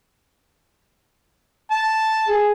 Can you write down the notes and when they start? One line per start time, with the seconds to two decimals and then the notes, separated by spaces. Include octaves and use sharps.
1.71 A5
2.28 G#4